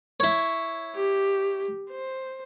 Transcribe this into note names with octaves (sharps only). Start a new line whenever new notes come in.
E4 C#5
G4
C5